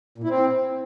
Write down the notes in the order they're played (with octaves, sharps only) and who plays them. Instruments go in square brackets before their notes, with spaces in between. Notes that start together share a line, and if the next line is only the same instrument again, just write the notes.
[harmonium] A#2
E4
C4